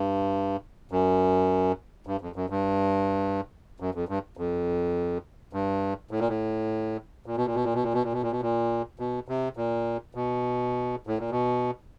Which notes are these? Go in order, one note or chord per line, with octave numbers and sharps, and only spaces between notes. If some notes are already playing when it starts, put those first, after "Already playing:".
Already playing: G2
F#2
G2
F2
F#2
G2
F#2
F2
G2
F2
G2
A2
A#2
A2
A#2
B2
A#2
B2
A#2
B2
A#2
B2
A#2
B2
A#2
B2
A#2
B2
C3
A#2
B2
A2
A#2
B2